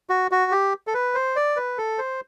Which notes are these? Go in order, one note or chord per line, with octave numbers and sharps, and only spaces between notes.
F#4
F#4
G4
A4
B4
C5
D5
B4
A4
C5